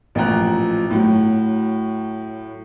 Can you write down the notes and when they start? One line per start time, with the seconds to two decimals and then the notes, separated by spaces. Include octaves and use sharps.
0.15 A1 A#2 F3 G5 A#5 F#6
0.90 A2 F#3